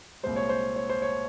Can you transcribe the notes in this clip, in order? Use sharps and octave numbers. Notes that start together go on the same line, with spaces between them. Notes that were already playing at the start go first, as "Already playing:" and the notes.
C2 A#2 G#3 C5
C#5
C5
C#5
C5
C#5